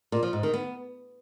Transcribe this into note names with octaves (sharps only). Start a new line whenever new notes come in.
A#2
F3
G#2
D#3
B3